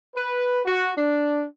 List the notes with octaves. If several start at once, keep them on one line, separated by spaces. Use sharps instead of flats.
B4
F#4
D4